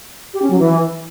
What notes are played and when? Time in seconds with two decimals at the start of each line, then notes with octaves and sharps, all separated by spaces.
0.34 G4
0.42 C#4
0.50 F#3
0.59 E3